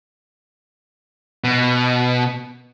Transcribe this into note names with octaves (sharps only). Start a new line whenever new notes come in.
B2